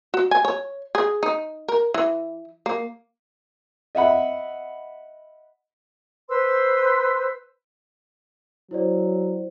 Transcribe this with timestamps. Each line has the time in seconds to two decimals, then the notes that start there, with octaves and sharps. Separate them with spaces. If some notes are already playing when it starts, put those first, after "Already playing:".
0.14 F#4
0.31 G#5
0.45 C#5
0.95 G#4
1.23 D#4
1.68 A#4
1.94 E3
2.66 A#3
3.95 D#5 E5 F#5 B5
6.29 B4 C5 C6 E6
8.71 F#3 E4 C5 D5